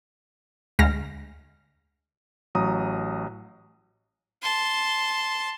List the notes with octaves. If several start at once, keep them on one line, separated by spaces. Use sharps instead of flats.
D2 G#3 F6 A#6
A1 F#3 A#5 D#6
A5 C6